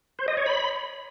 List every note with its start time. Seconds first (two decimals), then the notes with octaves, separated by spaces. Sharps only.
0.19 C5
0.28 D#5
0.37 C#5
0.46 B5